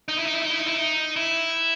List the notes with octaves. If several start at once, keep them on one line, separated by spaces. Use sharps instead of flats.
D#4
E4
D#4
E4
D#4
E4
D#4
E4
D#4
E4